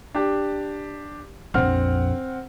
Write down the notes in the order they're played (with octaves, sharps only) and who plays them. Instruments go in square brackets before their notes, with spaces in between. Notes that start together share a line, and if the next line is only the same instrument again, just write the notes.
[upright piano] D4 G4
[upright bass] A#1 F2 [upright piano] C4 F#5 F6